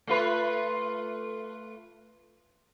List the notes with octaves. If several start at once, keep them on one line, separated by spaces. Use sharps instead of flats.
A3 F4 B4